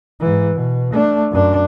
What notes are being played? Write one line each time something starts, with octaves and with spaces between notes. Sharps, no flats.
G#2 E3
B2
A3 D4
F#2 D4